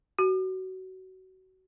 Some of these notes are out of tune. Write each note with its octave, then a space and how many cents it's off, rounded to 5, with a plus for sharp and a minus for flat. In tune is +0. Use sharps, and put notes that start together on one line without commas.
F#4 +20